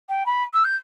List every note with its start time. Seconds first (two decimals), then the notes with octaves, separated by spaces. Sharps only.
0.09 G5
0.26 B5
0.54 E6
0.64 G6